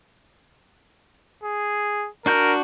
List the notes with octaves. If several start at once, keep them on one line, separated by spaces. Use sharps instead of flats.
G#4
D4 F#4 A#4 G6